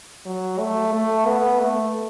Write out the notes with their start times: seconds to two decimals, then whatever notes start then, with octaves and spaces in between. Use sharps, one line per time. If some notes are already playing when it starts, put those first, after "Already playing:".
0.26 F#3
0.60 A3
0.93 A3
1.27 B3
1.60 A3